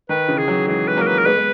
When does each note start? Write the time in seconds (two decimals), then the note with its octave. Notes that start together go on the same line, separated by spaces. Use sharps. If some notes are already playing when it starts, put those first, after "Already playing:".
0.09 D#3 B4
0.28 C#3 E3
0.38 G#4
0.48 D#3 F#3
0.67 E3 G#3 G#4
0.87 G#3 B4
0.97 F#3 A#3 A#4
1.07 B4
1.18 A#4
1.26 G#3 B3 B4
1.36 G#3